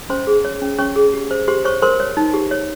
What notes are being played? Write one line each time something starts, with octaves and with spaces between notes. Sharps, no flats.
C#4 C5 C6
G#4
C#5
C#4
C#4 C#5 C#6
G#4
G4
C5
G4 C5 C6
C5 C#5 C#6
A#4 C5 C6
C#5
D#4
G4
C#5